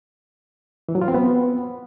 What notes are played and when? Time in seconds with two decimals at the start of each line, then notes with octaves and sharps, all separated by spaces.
0.89 E3
0.95 F#3
1.01 F4
1.08 C4
1.14 B3